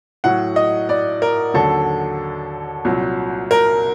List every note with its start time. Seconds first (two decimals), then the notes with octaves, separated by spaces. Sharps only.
0.24 A2 F#3 F#5
0.56 D#5
0.89 D5
1.22 A#4
1.54 D#2 D3 F#3 A4
2.85 C2 A#2 F#3
3.51 A#4